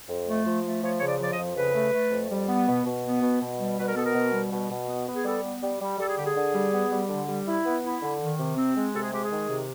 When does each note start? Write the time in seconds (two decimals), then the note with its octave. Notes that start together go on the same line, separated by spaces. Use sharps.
0.08 F2
0.27 A3
0.46 F3
0.65 A3
0.83 F3 C#5
0.98 C#3 C#5
1.07 D5
1.19 F3 D5
1.32 D#5
1.38 F2
1.56 C#3 B4
1.74 A3
1.92 A3
2.11 F2
2.30 G3
2.48 B3
2.67 B2
2.85 B2
3.04 B3
3.22 B2
3.41 B2
3.58 G3
3.77 B2 B4
3.87 A#4
3.95 B3 A4
4.04 A#4
4.14 B2
4.32 G3
4.52 B2
4.69 B2
4.87 B3
5.07 B3
5.15 G#4
5.24 G3 A4
5.43 B3
5.62 G3
5.80 G3
5.98 G3 A4
6.08 G#4
6.16 D3 G4
6.25 G#4
6.36 D3
6.54 G3
6.72 B3
6.91 G3
7.09 D3
7.27 G3
7.46 E4
7.65 B3
7.83 E4
8.02 D3
8.20 D#3
8.38 C3
8.56 C4
8.75 G#3
8.93 C3 A4
9.03 G#4
9.12 G#3 G4
9.23 G#4
9.31 D#3
9.48 C3